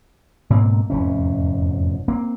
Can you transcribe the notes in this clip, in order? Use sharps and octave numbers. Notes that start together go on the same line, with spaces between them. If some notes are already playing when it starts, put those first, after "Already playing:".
G#2 B2 A#3 C4
F1 E2 G#2 C#4
A#3 C4